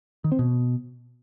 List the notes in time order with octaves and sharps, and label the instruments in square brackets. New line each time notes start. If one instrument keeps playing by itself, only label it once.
[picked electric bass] D#3
C4
B2